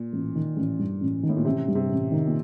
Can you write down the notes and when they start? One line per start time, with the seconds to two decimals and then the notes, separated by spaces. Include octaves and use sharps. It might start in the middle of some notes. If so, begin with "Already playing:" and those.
Already playing: A#2
0.13 A1
0.35 D#3
0.57 A1
0.79 G2
1.01 A1
1.23 D#3
1.29 A2
1.37 A#2
1.45 A1 C3
1.68 G2
1.75 C3
1.90 A1
2.12 D#3
2.27 A#2